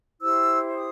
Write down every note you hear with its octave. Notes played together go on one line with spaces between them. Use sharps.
E4 G4 C5 E6
D#6